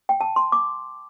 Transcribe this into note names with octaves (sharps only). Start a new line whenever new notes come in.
G5
A5
C6
D6